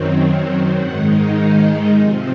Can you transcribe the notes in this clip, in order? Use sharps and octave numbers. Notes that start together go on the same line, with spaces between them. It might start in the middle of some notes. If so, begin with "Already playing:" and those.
Already playing: F#2 D#3 F#3 C4
G#2 D#3 G#3 D#4 F#5
F5
C3 F3 C4 G#5